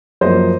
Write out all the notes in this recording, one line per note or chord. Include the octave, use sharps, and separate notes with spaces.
F#2 F3 A#3 C5 D#5